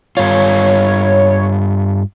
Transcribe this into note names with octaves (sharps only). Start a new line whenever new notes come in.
G2 F4 C#5